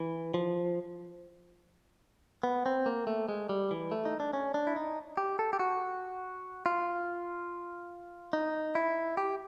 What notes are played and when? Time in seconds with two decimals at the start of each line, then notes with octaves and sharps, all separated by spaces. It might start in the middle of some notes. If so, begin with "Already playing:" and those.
Already playing: E3
0.34 F3
2.43 B3
2.66 C4
2.86 A#3
3.07 A3
3.29 G#3
3.49 G3
3.71 E3
3.91 A3
4.05 D#4
4.20 D4
4.33 C#4
4.54 D4
4.67 E4
4.76 D#4
5.17 G4
5.39 A4
5.53 G4
5.59 F#4
6.66 F4
8.33 D#4
8.75 E4
9.17 G4